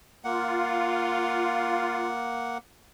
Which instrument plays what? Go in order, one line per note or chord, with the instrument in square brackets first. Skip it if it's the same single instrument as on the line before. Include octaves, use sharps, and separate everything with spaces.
[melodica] A#3 F#5 [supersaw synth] F4